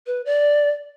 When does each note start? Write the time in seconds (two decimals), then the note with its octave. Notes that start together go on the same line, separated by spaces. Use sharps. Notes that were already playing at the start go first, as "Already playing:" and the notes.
0.07 B4
0.26 D5